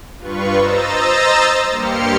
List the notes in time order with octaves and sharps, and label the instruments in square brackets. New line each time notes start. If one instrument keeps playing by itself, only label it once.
[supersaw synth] G2 F4 B4 C#6
C5 D#5 A#5 E6 A6
G2 A#3 G4 C6 F6 C#7